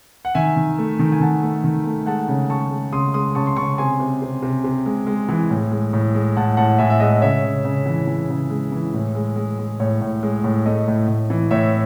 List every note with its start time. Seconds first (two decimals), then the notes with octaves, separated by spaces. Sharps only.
0.25 F#5
0.35 D#3 E5 G#5
0.57 D#3
0.78 A3
0.99 D#3
1.12 G#5
1.20 D#3 F#5 A5
1.43 A3
1.64 D#3
1.85 A3
2.06 G#3 F#5 A5
2.28 C#3
2.50 G#3 A5 C#6
2.71 G#3
2.92 C#3 C6 D#6
3.14 G#3 C6 D#6
3.35 C#3 A5 C#6
3.47 C6
3.57 C#3 A5 C#6
3.78 C3 G#5 C6
4.00 C3
4.22 C3
4.42 C3
4.64 C3
4.86 G#3
5.07 G#3
5.29 E3
5.50 A2
5.72 G#3
5.93 A2
6.15 G#3
6.36 A2 F#5 A5
6.57 A2 F#5 A5
6.78 A2 E5 G#5
6.90 E5
7.00 G#3 D#5 F#5
7.21 C#3 C#5 E5
7.44 C#3
7.64 C#3
7.86 E3
8.07 E3
8.30 C#3
8.50 G#3
8.72 E3
8.94 A2
9.15 G#3
9.36 G#3
9.58 G#3
9.80 A2 C#5
10.01 A2
10.23 G#3
10.44 A2
10.66 A3 D#5
10.87 A2
11.08 A2
11.30 E3
11.51 A2 C#5 E5